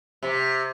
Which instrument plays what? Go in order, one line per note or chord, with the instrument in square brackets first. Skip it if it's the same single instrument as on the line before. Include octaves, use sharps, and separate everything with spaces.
[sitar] C3